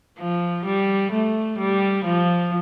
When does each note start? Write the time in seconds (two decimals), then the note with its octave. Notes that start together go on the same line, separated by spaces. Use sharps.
0.19 F3
0.65 G3
1.11 A3
1.58 G3
2.04 F3